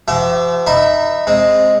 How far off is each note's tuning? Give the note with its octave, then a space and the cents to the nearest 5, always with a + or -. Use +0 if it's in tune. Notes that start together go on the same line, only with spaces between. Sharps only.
F3 -35 G4 -45 E5 +20
D#4 -20 E5 +0 B5 +0
G#3 +0 C4 +0